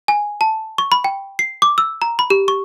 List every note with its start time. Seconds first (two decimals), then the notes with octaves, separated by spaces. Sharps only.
0.08 G#5
0.41 A5
0.78 C#6
0.92 B5
1.04 G5
1.39 C7
1.62 D6
1.78 E6
2.02 A#5
2.19 B5
2.30 G4
2.48 C#6